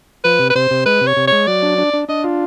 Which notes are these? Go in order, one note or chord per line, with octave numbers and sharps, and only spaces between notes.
F3 B4
C3
B4
C3 C5
C3
G#3 B4
C3
C#5
C3
G#3 C#5
F#3 D5
D4
D4
D4
D4 D#5
F4